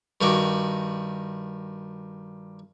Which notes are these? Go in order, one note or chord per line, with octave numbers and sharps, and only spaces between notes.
G2 D#3 F#4 D6